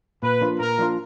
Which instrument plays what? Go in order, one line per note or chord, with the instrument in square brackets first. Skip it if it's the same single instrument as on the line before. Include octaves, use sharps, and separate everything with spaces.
[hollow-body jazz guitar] A#2 [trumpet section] B4
[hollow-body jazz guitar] F3 A#3 D4 F4
[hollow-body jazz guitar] A#2 [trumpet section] A#4
[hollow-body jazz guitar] F3 A#3 D4 F4